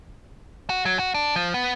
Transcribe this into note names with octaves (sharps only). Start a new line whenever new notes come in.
F#4
F#3
F#4
D4
F3
B3